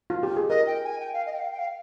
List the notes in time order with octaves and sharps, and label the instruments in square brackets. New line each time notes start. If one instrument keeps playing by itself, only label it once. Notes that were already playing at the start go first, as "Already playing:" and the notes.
[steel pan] F4
G4
G#4
[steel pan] A#4 [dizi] D#5
[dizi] G5
G#5
G5
F5
D#5
G5
F5
G5
F5